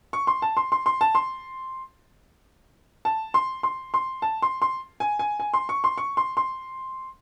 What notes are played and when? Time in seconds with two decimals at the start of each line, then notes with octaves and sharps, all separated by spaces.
0.13 C#6
0.27 C6
0.42 A5
0.57 C6
0.72 C6
0.86 C6
1.01 A5
1.15 C6
3.05 A5
3.34 C6
3.63 C6
3.94 C6
4.22 A5
4.42 C6
4.62 C6
5.00 G#5
5.19 G#5
5.40 G#5
5.54 C6
5.69 C#6
5.84 C6
5.98 C#6
6.17 C6
6.37 C6